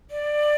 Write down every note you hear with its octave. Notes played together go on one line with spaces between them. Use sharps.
D5